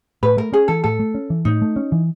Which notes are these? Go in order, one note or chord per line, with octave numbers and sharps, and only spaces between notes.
A2 B4
A3 A#4
C#4 G#4
E3 A4
A2 A4
A3
C#4
E3
A2 D#4
A3
C#4
E3